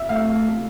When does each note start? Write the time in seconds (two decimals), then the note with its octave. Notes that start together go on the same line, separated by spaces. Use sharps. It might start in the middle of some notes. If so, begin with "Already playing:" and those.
Already playing: E5
0.09 A3 F5